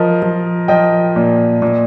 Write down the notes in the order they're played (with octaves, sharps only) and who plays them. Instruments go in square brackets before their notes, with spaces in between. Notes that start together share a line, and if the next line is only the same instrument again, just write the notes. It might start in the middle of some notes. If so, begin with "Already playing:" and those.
Already playing: [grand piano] F3 A#4 D#5
F3
F3 D#5 G5
A#2
A#2